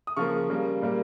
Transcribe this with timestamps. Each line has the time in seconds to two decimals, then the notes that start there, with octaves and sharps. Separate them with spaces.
0.07 D#6
0.17 C#3 F3 A#3 C#6 F6
0.50 C#3 G3 A#3
0.82 A#2 G3 A#3